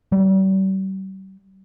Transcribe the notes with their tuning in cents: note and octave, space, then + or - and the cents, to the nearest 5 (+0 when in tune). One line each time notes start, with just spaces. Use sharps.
G3 -40